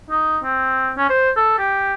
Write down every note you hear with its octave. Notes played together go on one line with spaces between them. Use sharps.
D#4
C4
C#4
C5
A4
G4